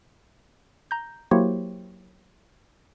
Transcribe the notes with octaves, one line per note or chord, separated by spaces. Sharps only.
A#5 G6
F#3 A#3 E4 G4 C5 C#5